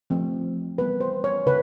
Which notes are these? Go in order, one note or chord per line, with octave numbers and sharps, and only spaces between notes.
F3 A3 C4
E3 G3 B3 B4
C5
C#5
C#3 B4